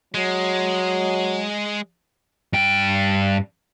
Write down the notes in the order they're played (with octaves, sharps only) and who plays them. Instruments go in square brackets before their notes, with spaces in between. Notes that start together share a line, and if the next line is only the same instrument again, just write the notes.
[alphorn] F#3 [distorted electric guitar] G#3
[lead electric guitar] G2 G5